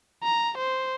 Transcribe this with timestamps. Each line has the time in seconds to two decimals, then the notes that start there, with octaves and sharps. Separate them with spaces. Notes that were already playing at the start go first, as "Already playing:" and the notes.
0.23 A#5
0.58 C5